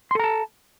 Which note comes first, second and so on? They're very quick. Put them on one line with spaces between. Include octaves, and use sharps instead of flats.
C6 A4 A#5 A5